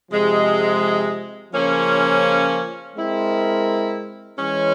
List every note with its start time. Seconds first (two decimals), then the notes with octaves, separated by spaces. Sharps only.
0.11 C3 F3 G#3
1.54 C#3 F3 A#3 C#4
2.95 G#3 C4 E4 A#4
4.37 E3 G#3 C#4